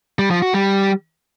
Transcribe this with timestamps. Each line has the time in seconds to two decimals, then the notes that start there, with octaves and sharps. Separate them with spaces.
0.19 G3
0.30 F3
0.42 F#4
0.54 G3